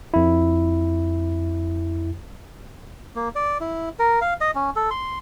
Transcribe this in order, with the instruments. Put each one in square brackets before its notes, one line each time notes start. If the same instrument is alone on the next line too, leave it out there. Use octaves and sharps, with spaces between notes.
[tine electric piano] F2 E4
[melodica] A#3
D5
E4
A#4
F5
D#5
C#4
A4
C6